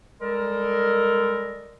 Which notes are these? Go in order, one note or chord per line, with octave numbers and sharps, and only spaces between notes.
G3 G#3 A4 A#4